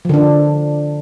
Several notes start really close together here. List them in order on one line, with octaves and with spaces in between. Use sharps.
F3 D3 D4